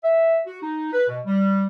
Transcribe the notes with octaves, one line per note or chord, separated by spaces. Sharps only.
E5
F#4
D#4
B4
B2
G3